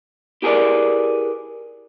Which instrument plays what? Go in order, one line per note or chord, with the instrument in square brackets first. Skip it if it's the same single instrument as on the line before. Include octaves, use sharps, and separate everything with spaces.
[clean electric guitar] E4 G4 G#4 A#4 B4 D5